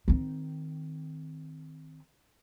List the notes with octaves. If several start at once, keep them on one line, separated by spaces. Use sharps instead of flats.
D#3 C4